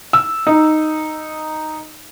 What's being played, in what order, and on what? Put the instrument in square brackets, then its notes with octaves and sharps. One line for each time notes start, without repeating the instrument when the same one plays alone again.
[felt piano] E6
D#4